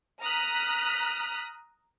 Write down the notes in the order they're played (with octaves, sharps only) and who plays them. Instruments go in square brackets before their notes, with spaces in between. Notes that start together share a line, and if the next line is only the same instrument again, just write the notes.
[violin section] A#5 D#6 F6 F#6 B6